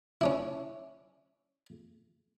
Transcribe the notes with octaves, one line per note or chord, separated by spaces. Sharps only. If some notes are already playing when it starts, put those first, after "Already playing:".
C#4 D4 E4